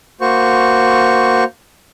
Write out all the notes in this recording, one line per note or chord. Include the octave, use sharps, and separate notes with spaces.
A#3 F#4 C5 C#6